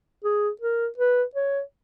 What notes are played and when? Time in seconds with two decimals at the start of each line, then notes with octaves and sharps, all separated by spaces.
0.24 G#4
0.61 A#4
0.98 B4
1.35 C#5